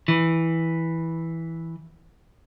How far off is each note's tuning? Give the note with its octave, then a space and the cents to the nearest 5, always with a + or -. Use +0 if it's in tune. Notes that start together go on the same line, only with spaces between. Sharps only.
E3 -5